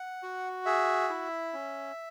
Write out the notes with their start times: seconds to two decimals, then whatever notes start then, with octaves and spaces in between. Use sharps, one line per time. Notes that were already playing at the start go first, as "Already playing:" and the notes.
Already playing: F#5
0.23 F#4
0.66 G#4 E5
1.09 E4
1.53 C#4